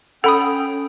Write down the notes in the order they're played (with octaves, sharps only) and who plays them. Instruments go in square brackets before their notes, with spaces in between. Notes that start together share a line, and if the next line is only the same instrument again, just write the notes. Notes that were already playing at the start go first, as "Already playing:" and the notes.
[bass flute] C#4 [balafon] A4 [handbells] F#5 B5 D#6 [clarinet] G5